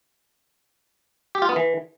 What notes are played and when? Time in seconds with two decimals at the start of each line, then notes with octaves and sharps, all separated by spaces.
1.35 G4
1.42 F4
1.49 B3
1.56 E3